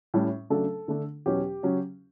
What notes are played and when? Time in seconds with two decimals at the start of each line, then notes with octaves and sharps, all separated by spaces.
0.14 A2 G3 C#4
0.50 C#3 F#3 A3 D4 A4
0.88 D3 A3 D4
1.26 E2 B2 F#3 C#4 G4
1.63 C#3 F#3 C#4